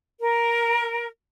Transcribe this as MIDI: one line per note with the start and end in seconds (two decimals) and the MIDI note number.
0.21 1.07 70